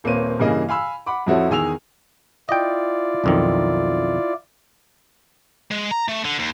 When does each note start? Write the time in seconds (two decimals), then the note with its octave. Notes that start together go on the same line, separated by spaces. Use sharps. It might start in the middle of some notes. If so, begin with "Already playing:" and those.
0.04 D#1 A#3 C4 B4 C#5 D#7
0.39 G2 C#3 E3 A#3 G#4 D#5
0.69 F5 G#5 B5 E6
1.06 F#5 B5 D6
1.26 F2 F3 E4 F#4 A4 C#5
1.49 E2 D#3 G#4 G#5 E6 F7
2.49 E4 F4 D5 D#5 G5
3.24 B1 F2 D#3
5.71 G#3
5.91 A#5
6.08 A3
6.24 D3
6.39 D#2